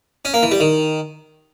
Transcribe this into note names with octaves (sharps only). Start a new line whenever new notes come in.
C#4
A#3
E3
G3
D#3